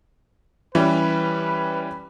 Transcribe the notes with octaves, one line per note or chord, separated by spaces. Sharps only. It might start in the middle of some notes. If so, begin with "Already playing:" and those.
E3 G3 C#4 B4